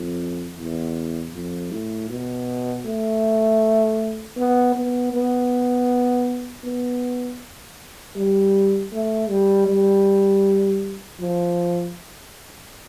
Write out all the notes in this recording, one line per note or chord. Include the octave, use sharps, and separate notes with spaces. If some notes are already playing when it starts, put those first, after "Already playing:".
Already playing: F2
E2
F2
A2
B2
A3
B3
B3
B3
B3
G3
A3
G3
G3
F3